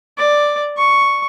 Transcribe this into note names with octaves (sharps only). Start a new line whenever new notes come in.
D5
C#6